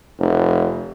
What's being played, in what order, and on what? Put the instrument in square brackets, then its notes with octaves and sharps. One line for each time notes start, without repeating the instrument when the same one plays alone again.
[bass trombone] F1